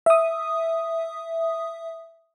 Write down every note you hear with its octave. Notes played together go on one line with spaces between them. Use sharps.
E5 D#6